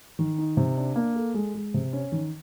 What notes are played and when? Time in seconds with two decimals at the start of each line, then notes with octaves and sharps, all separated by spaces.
0.19 D#3
0.38 D#4
0.57 C3
0.77 D4
0.96 A#3
1.16 A4
1.34 G#3
1.54 G#3
1.74 C3
1.93 C#4
2.12 D#3